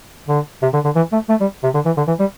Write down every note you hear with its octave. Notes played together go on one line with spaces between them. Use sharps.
D3
C3
D3
D3
E3
A3
A3
G3
C3
D3
E3
D3
E3
G3